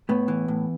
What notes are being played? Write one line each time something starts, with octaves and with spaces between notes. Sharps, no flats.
A2 B3
E3
A2